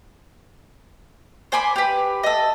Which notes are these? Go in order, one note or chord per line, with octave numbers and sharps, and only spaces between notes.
C5 G#5 B5 D6
G4 B4
A4 D#5